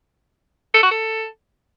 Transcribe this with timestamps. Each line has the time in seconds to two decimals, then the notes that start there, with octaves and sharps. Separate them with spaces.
0.74 A4
0.83 F#4
0.91 A4